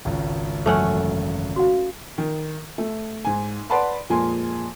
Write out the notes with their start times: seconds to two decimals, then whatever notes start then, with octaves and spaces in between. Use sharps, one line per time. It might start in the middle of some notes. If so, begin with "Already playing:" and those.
0.05 G#1 C#2
0.66 F#2 E3 F#3 A3 C#4 F#5
1.56 F#4 F5
2.18 D#3
2.78 A3
3.25 G#2 G#5
3.70 B4 D5 F#5 A5 B5 C6
4.10 F2 A#2 G#3 A#3 G#5 C6